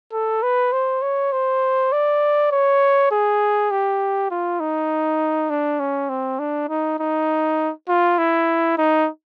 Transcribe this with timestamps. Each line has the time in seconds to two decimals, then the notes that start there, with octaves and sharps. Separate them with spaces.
0.13 A4
0.43 B4
0.73 C5
1.02 C#5
1.32 C5
1.92 D5
2.52 C#5
3.11 G#4
3.71 G4
4.31 F4
4.60 D#4
5.50 D4
5.80 C#4
6.09 C4
6.39 D4
6.69 D#4
6.99 D#4
7.89 F4
8.18 E4
8.78 D#4